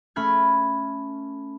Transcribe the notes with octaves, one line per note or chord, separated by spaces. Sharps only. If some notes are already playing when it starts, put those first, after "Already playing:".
A3 C#4 B5 F6 G#6